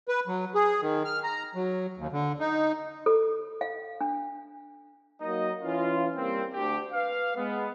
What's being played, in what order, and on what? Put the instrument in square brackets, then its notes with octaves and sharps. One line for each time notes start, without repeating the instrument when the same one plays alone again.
[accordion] B4
F#3
G#4
D#3
F6
A#5
F#3
D#2
D3
D#4
[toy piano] A4
F5
D4
[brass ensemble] F#3 A#3 D#4 D#5
E3 C#4 F4
G3 A#3 C4
D2 G4
B4 F5
G#3 B3